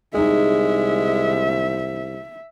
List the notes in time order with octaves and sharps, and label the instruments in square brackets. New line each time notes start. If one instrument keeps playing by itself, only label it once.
[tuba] C2 [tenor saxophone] G#3 [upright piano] D#4 G#4 [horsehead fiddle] E5